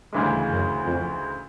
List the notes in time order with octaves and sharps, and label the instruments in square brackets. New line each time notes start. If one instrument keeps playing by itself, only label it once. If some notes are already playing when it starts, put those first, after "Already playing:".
[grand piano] D2 C#3 E3 G#3 [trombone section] G2
[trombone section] F#2
F2